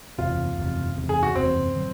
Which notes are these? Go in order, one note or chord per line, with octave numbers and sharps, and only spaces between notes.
F#1 E2 C3 F4
F#1 E2 C3
F#1 E2 C3
G#4
F#4
F#1 E2 C3 C4
D3 F#3